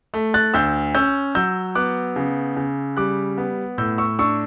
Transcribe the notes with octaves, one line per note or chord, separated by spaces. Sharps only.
A3
F#6 A6
D2 E6 G6
C#4 E6 G6
F#3 E6 G6
B3 D6 F#6
C#3
C#3
G3 D6 F#6
B3
A2 E6 G6
C#6 E6
D4 C#6 E6